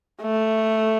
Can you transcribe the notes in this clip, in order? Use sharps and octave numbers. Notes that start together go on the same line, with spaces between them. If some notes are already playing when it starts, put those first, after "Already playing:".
A3